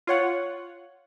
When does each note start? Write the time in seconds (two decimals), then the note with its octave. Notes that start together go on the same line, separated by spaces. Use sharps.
0.07 F4 C#5 F#5